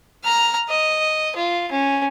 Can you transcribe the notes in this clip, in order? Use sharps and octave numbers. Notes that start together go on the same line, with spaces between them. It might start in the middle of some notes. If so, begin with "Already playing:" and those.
A#5 F6
D#5
F4
C#4